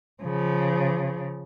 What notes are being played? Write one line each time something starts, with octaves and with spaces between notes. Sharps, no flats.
C#3 F3